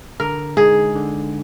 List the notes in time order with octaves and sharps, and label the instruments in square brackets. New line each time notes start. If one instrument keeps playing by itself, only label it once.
[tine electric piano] D3 [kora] A#4
[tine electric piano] G#3 D#4 [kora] G#4
[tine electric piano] D3